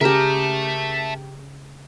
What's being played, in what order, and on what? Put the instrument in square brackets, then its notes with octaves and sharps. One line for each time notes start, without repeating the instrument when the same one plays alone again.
[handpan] C#3 G#4 [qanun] G4 A#4 [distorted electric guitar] E5 A5